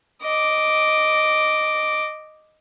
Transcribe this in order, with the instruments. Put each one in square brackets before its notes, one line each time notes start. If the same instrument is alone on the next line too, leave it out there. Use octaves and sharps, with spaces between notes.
[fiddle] D#5 D6